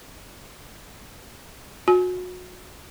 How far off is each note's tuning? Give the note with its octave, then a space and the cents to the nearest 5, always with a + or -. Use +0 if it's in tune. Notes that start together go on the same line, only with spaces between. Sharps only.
F#4 -30 G#5 +25